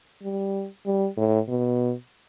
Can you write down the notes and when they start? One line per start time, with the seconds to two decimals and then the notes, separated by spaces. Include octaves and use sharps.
0.22 G3
0.86 G3
1.17 A2
1.49 B2